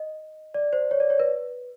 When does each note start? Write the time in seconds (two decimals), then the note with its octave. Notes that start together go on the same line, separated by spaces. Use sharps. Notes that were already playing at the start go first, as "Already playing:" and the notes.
Already playing: D#5
0.54 D5
0.73 C5
0.91 C#5
1.00 D5
1.10 C#5
1.20 B4